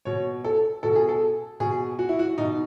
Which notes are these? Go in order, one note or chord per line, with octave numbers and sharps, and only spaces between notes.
B2 C#5
A4
B2 A4
G#4
A4
B2 G#4
F#4
E4
F#4
B2 D#4